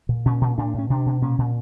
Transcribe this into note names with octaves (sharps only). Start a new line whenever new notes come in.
A#2
A#2 C#4
A#2
A2 D4
A2 C#4
B2 D4
B2
A#2 C#4
A#2